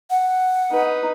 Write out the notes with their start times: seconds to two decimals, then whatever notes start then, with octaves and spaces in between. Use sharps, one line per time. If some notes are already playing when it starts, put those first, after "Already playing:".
0.10 F#5
0.71 D#4 B4